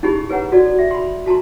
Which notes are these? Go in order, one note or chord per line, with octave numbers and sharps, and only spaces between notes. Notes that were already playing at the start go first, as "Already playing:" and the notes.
C#4 D#4 E4 G4 G#4 B5
G#4 B4 C#5 F#5 A#5
F#4 A4 D5
E5
B5 C6
F#4 A5 A#5 C6